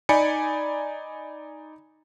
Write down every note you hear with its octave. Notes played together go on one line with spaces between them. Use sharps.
D#4 D5 G#5 B5 C#7